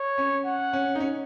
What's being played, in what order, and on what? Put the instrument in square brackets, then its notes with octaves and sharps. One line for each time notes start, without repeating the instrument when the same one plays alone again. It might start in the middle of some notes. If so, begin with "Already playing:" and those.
Already playing: [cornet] C#5
[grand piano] C#4
[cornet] F#5
[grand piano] C#4
D#4
C#4